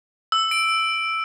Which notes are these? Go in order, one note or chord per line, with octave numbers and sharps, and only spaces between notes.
E6
D7